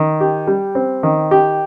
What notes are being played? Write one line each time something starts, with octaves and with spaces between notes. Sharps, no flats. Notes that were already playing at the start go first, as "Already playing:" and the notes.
Already playing: D#3
G4
G3
C4
D#3
G4